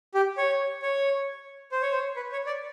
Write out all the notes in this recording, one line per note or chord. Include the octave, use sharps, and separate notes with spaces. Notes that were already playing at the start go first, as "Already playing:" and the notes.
G4
C#5
C#5
C5
C#5
C5
B4
C#5
D5